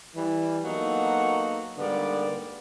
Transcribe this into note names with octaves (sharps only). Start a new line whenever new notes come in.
E3 G3
F#3 A#3 B3 D#4 F#4 A4
G#2 D3 G3 A#3 B3 D5